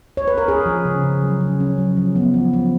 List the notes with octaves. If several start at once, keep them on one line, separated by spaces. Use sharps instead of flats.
C#5
B4
A#4
C#4 G#4
F3
C#3
C#3
F#3
C#3
C#4
F#3
F3
B3
F3
F3